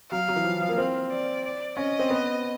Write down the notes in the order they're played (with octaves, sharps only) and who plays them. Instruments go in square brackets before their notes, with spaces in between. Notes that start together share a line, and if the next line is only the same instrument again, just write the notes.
[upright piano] F#3 [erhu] F5
[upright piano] F#3
E3
F3
F3
A#3
C4
[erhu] D5
D5
[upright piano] C#4 [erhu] D#5
[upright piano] C4
B3